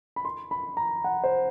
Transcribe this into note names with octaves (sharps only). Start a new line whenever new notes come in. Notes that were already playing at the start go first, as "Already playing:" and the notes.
B5
C6
B5
A#5
F#5
C5